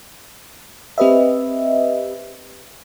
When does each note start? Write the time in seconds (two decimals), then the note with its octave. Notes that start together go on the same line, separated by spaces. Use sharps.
0.98 C4 G4 B4 D#5 E5